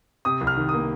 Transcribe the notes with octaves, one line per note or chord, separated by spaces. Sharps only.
C3 D#6
C2
F6
D#3
D#6
A#3